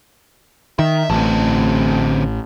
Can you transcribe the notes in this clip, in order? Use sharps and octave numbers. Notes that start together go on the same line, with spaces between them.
D#3 E5
A1 D3 C4